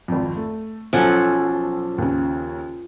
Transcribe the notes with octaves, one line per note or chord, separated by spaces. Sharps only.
G#1 F2
A3
B1 F3 C#4 A4 F#5
D#2 C#3